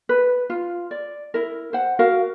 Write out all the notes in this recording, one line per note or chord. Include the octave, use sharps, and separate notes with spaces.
B4
F4
D5
E4 A#4
C5 F#5
F#4 A#4 F5